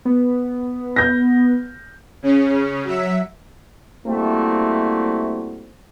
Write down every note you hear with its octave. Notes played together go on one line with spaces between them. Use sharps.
B3
G6 A#6
C#3 C#4
F#3 E5
G3 A3 A#3 C4 E4 F#4